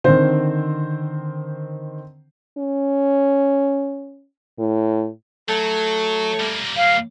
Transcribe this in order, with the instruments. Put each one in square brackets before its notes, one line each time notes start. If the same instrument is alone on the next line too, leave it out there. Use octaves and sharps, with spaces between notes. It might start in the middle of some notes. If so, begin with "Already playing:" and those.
[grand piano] D3 D#3 [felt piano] C4 C5
[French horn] C#4
A2
[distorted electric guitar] F#3 [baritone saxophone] A3
[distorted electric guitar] G3 A#3
[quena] F5